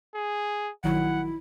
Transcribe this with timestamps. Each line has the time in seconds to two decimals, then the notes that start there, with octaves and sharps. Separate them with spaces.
0.15 G#4
0.84 A#1 D#3 F#3 E4 F#5